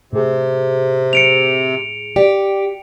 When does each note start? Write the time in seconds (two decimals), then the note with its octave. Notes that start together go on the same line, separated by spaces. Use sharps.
0.13 A2 C3 G#4
1.13 C#7 D7 F7
2.16 G4 D5